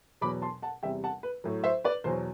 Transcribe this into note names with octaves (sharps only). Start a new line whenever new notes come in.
E2 B2 F#3 B5 D6
A5 C6
F#5 A5
E2 C3 G3 E5 G5
F#5 A5
B4
A2 F#3
C5 E5
B4 D5
E2 B2 F#3 C5